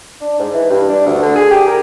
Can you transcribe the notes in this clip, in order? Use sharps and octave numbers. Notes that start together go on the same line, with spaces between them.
D4
G#2
E3
G2
D4
D2
D3
G#4
G4
A#4